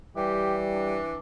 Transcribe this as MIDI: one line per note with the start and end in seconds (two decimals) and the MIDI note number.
0.17 1.18 52
0.17 1.01 55
0.17 0.60 67
0.73 1.19 62